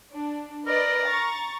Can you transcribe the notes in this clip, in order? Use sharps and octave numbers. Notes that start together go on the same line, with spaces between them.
D4
A#4 B4 D5 D#5
A#5 C#6 A6